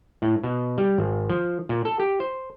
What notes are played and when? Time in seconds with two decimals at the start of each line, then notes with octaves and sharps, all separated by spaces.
0.22 A2
0.43 B2
0.78 G3
0.98 G#1
1.30 F3
1.69 A#2
1.85 A4
1.99 G4
2.20 C5